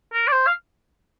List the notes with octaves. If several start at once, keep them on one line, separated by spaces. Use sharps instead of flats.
A#4
D5
C5
F5